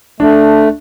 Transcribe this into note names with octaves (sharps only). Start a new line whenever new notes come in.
A3 D4